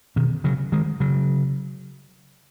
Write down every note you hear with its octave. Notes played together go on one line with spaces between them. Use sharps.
B2 D#3
C#3 F#3
D#3 G#3
C#3 F#3